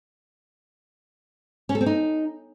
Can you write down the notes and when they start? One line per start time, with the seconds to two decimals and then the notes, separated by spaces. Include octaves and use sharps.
1.69 C#4
1.75 A4
1.81 C4
1.86 D#4